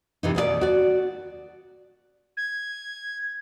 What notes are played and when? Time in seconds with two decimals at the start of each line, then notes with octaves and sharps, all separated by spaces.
0.23 C3 E3 D#4
0.35 D#2 B2 F#4 D5
0.61 F#4 D5
2.37 G#6